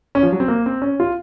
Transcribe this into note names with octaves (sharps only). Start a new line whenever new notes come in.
C#4
F3
F#3
C4
A#3
C4
C#4
F4